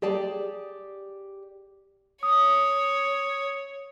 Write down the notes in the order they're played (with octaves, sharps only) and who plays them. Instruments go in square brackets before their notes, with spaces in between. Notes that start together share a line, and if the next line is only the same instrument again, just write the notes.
[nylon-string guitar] G4 G#4 D5 A5
[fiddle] C#5 [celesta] D#6